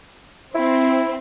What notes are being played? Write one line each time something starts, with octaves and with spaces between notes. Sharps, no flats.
C4 E4